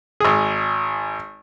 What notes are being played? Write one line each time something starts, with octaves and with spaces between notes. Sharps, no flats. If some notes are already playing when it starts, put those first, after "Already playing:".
G#1 G#4